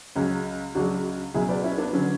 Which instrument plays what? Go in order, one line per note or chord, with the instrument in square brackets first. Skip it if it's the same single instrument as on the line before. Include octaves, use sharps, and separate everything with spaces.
[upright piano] C#2 C#3 F#3 C#4
C#2 C#3 F#3 D4 F#4
C#2 B2 F#3 E4 G#4
B4 D5
C#4 E4
B3 D4
D3 F#3 C#4